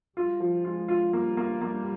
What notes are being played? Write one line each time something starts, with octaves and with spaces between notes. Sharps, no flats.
G3 F4
F3
G#3 F4
F4
G3 A#3
A#3
G3 A#3